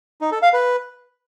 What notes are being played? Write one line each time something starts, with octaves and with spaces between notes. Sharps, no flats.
D#4
A4
F5
B4